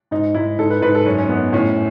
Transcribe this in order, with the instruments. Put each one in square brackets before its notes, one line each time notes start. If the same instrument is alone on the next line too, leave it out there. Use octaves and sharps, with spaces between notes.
[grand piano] G#2 D#4
G#2 E4
G#2 A4
B4
G#2 B4
A4
F#2 C#4
C#4
F#2 B3
A2 C#4